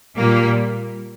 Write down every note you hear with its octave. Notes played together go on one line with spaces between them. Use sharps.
A#2 G3 A#3